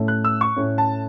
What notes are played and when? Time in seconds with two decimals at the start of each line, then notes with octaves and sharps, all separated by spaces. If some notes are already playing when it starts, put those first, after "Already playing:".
Already playing: A2 A3 C#4
0.08 F#6
0.24 E6
0.41 C#6
0.56 A2 A3 C#4
0.78 A5